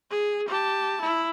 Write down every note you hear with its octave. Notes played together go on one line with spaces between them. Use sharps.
G#4
G4 A5
E4